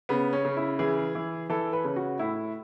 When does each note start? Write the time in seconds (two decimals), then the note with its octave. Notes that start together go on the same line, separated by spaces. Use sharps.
0.09 C#3 B3
0.33 C#4
0.45 C#3
0.57 E4
0.79 E3 G#4
1.15 E3
1.50 E3 A4
1.73 B4
1.84 C#3
1.96 F#4
2.19 A2 E4